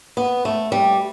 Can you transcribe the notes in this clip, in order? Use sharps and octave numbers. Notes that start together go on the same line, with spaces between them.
B3
A3
G3